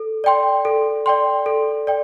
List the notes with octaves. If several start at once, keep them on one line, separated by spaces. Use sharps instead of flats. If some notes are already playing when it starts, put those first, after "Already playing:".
Already playing: A4
D5 G5 C6
A4
D5 G5 C6
A4
D5 G5